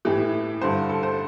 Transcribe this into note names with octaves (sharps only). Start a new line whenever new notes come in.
A2 E3 G4
G2 D3 C5
A4
C5